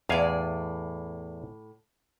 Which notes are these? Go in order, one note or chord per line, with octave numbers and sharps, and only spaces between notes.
E2 A2 D5 F5 G#5